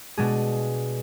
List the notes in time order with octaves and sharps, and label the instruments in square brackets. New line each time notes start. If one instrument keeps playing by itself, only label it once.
[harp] B2 G#3 D4 G#4